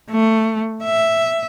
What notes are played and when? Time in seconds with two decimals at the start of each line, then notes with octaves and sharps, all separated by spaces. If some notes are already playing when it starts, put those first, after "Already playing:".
0.10 A3
0.83 E5